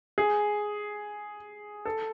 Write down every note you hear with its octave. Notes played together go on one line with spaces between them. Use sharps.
G#4
A4